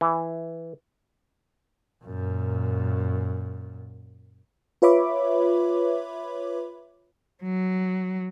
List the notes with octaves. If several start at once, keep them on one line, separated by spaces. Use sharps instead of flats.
E3
F#2 A#2
F4 B4 C#5 E5 B5 D6
F#3